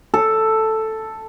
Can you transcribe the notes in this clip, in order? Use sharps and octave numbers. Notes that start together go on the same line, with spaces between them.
A4